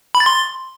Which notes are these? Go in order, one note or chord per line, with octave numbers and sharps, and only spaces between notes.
B5
A6
C6